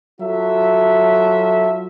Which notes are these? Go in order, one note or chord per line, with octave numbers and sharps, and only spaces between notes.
F#3 F4 A4 E5